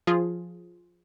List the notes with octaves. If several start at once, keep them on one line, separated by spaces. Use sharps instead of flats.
F3 F4 G#4